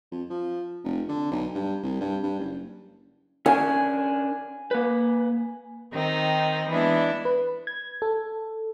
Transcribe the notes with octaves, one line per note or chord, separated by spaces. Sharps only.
F2
F3
F1
D3
B1
G2
C2
G2
G2
F#1
C#4 D4 A#4 G#5
A#3 B4
D#3 C4 D#4
E3 G#3 B3 D4 E4
B4
G#6
A4